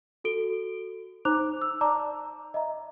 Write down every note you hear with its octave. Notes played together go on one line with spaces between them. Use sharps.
F#4 A4 D7 G7
D#4 C5 A#5 D6 F#6 F7
E6
D5 A5 A#5 D6
D#5 E5 A#5